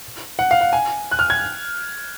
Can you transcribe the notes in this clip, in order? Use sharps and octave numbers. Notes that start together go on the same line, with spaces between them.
F#5
F5
F#5
G#5
F#6
F6
G#6